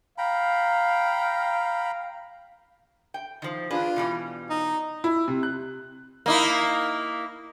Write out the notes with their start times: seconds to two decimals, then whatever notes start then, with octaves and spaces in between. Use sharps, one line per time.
0.18 F5 G5 A#5 B5
3.14 G5
3.42 D#3 F3
3.70 D4 F4 G#4 B4
3.96 B2 E3 G3
4.50 D#4
5.04 E4
5.28 C3
5.43 F#6
6.26 A#3 D#4 E4